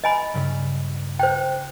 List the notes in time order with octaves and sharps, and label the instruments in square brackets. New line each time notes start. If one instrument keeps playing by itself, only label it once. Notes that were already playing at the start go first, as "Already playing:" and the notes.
[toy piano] D#5 G#5 B5
[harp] G2 C#3 G3
[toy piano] C5 G5 [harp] F#6 G6